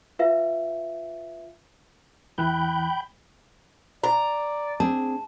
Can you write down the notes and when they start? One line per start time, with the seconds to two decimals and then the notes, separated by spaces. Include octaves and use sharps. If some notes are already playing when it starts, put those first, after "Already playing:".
0.19 F4 B4 E5 F5
2.38 E2 E3 G5 B5 F#6 G6
4.04 D5 A#5
4.80 C4 D4 G#4 A5